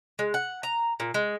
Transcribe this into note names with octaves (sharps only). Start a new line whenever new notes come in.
G#3
F#5
A#5
A#2
G#3